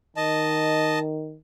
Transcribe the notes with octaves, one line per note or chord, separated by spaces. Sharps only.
D#3 D#5 A5